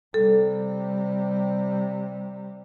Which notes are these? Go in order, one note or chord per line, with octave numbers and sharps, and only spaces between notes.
C3 G3 A4